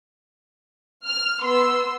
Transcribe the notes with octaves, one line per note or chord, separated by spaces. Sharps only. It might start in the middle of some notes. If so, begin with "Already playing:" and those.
F6
B3 C6 E6